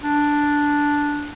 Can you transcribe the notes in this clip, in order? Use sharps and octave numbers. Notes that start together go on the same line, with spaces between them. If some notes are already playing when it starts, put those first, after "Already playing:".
D4